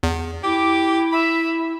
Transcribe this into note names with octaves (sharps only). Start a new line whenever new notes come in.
E2
E4 G4 D6
E5 B5